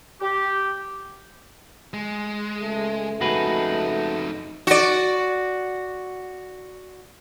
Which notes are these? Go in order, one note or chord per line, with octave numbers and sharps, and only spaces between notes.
G4
G#3
C#2 A3
F2 D#4 F#4 G#4 B4
F#4 D5